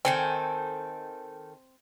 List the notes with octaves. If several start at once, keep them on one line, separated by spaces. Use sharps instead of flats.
D#3 C4 A4 G#5